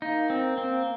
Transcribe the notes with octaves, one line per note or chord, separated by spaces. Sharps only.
A#3 D#4
C4
C4